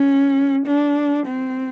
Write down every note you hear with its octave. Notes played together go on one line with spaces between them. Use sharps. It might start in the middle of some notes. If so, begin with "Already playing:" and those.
Already playing: C#4
D4
C4